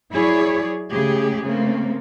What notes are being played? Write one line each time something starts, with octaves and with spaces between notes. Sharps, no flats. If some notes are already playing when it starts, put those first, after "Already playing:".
F#3 E4 G#4 C#5 D5
C#3 G#3 A3 G4 G#4
C#3 A3 A#3 C4